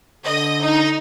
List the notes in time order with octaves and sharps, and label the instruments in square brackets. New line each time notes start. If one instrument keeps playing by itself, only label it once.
[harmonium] D3 [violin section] D#5
[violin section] D#4